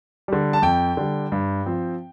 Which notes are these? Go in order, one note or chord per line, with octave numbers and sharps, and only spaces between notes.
D3 G3
A5
F2 G5
D3 G3
G2
F3 C4